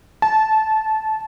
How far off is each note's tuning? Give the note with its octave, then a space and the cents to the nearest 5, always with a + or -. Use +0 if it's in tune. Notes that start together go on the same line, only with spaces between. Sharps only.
A5 -20